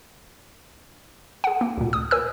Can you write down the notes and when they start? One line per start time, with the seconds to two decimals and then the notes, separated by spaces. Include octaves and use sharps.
1.44 G#4 F#5
1.61 A#3
1.77 D2 A#2
1.93 D#6
2.11 A#4 G#5 E6